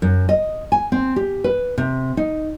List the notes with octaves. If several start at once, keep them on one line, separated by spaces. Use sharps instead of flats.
F#2
D#5
G#5
C4
G4
B4
C3
D#4